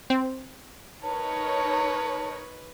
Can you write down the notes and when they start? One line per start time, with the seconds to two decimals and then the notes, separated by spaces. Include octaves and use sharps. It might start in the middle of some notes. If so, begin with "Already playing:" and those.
0.10 C4
1.03 D#4 A#4 B4 C#5 A5